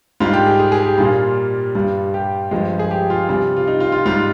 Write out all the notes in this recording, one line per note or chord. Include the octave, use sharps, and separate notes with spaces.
G#2 G3 F4
G4
G#4
G#4
G#4
G4
A#2 G3 F4
G2 G3
G4
G2 F3 G#3
G#4
G4
F4
C3 G3
F4
D#4
F4
F4
G#2 G3 F4